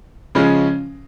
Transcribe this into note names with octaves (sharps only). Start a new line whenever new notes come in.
C#3 F3 G#3 C#4